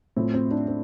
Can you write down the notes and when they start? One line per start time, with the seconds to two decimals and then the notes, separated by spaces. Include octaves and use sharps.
0.17 A2 F3 C4
0.34 C4
0.51 D4
0.68 C4